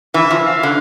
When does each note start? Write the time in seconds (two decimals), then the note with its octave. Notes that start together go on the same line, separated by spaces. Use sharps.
0.14 E3 E5
0.31 F3
0.46 F5
0.63 D3